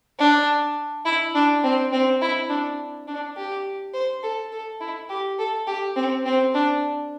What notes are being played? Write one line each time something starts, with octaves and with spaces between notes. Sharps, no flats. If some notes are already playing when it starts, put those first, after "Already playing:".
D4
E4
D4
C4
C4
E4
D4
D4
G4
C5
A4
A4
E4
G4
A4
G4
C4
C4
D4